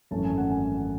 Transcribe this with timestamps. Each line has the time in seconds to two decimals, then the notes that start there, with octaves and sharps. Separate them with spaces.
0.11 G#1 F#2 E3 A3 C#4 A5
0.24 G#5
0.37 F#5
0.51 G#5